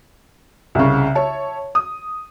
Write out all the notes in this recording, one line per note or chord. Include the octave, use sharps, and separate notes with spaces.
C2 C#3
C#5 E5 A5
D#6